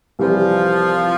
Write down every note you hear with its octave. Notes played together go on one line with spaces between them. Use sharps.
C2 C3 E3 F3 G3